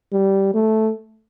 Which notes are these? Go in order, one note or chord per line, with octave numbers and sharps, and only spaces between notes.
G3
A3